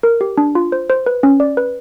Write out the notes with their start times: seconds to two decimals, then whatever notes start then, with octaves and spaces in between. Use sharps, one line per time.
0.03 A#4
0.21 G4
0.38 D4
0.55 F4
0.72 C5
0.90 C5
1.06 B4
1.23 C#4
1.40 D5
1.57 B4